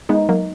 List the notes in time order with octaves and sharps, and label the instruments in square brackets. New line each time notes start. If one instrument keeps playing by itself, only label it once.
[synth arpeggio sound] G#3 B3 [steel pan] D#4
[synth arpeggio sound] F#3 A#3